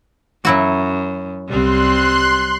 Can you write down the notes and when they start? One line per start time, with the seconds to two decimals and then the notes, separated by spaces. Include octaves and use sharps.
0.45 F#2 F#3 E4 F#4
1.49 C2 G3 C4 C6 F#6